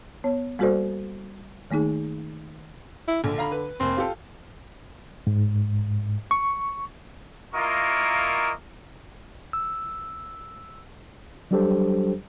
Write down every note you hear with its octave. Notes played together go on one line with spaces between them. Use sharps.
B3 C#5
G3 A#3 F#4 A4 C5 D5
D#3 A3 A#3 D#4 G#4
E4
A#1 D3
F5 A#5 B5
B4
F1 A#3 C4
F4 G4 A4
G#2
C#6
A#3 E4 F4 A#4 D#5 C#6
E6
F#3 G3 D4 G4 A4 C5